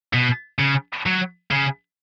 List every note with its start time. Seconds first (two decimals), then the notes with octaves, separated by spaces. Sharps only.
0.14 B2
0.60 C#3
1.06 F#3
1.51 C#3